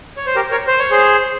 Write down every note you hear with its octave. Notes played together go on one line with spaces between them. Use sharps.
C#5
C5
G4 A#4
A#4 C#5
C5
C#5
G#4 C5